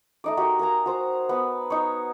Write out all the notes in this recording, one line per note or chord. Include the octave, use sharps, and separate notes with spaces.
A3 D#4 D6
D#4 F#4 G4 A#4
A#4 F5 G#5 A#5
F#4 C5 A#5
B3
D#4 C#5